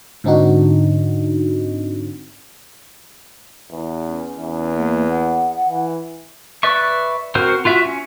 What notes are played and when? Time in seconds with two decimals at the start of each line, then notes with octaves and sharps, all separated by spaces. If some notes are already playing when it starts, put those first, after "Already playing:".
0.24 G#2 D3 C4 D4 D#4 F#4
3.71 E2
4.07 C#4
4.39 E2
4.77 A#3
5.09 F#5
5.69 E3
6.63 B4 D5 E5 C#6
7.35 C4 F#4 A#4 C5
7.65 F4 F#4 E5
7.85 C#4